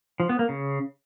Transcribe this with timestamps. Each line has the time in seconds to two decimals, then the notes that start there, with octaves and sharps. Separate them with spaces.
0.20 F3
0.29 B3
0.39 A#3
0.49 C#3